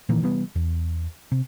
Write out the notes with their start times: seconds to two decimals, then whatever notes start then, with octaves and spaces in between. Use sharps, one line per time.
0.09 A#2 D#3 E3 A#3
0.22 C3 E3 G3 B3
0.55 E2
1.32 C3